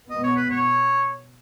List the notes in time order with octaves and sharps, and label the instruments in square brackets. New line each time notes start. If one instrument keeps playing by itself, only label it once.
[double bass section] B2 B3 [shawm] D#5
[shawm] C#5
B4
C#5